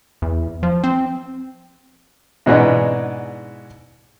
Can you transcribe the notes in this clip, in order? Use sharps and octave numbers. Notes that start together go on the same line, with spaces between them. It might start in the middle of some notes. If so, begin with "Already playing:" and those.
E2
F3
C4
G#2 B2 E3 G#3 B3 D4